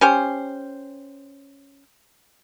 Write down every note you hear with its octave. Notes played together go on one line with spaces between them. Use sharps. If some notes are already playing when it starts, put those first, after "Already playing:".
C#4 G4 C5